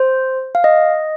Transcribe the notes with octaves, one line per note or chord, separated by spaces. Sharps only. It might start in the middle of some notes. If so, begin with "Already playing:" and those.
Already playing: C5
F5
D#5